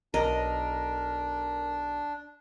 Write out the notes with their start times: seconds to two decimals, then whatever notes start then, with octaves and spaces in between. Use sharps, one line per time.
0.14 B1 D4 A#4 D#5